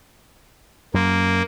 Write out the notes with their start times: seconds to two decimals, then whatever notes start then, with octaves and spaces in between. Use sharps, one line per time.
0.94 F#2 A#3